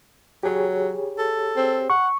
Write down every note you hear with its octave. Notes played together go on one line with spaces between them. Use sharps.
F#3 G4 G#4 C#5
A4
C4
F#5 C#6